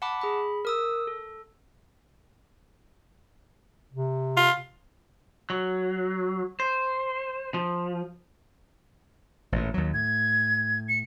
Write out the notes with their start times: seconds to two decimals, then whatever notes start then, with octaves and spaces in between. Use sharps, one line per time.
0.02 F#5 A5 B5 D6
0.21 G#4 B5
0.65 A#4 D#6 E6
1.07 A4
3.92 C3
4.37 F4
5.50 F#3
6.60 C5
7.54 F3
9.52 A1 A#2
9.74 D#2 F#3
9.94 A2 G#6
10.89 C#7